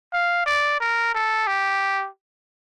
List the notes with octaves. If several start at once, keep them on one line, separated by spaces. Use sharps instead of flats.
F5
D5
A#4
A4
G4